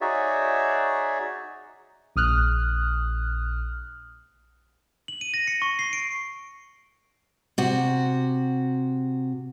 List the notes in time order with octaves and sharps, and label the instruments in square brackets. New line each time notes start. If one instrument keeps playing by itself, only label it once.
[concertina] D#4 F#4 G#4 C#5 D5 E5
[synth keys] A#1 D#6 F6 F#6
[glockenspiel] F#7
D#7
A#6
C#7
C#6
C7
D7
[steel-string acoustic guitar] C3 F#4